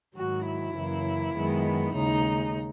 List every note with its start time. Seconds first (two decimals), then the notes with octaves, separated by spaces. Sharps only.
0.15 G#2 D#3 F#3 F#4
0.46 E4
0.75 F#2 C#3 E3 A#3
1.35 F#2 D#3 G#3 B3
1.94 D#2 C#3 G#3 D#4